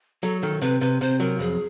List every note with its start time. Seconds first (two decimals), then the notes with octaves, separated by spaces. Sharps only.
0.23 F#3 A4
0.42 D#3 A4
0.61 C3 B4
0.81 C3 B4
1.01 C3 C5
1.20 F#3 A#4
1.39 F2 G#4